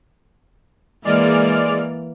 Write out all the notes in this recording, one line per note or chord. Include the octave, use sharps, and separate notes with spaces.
E3 G#3 A#3 D5 F6